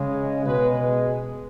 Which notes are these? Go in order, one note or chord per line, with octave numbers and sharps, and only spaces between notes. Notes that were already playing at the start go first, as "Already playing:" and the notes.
Already playing: C#3 G#3
B2 G#3 B4